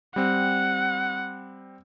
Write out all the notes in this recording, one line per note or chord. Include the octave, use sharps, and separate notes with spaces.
G3 C4 F#5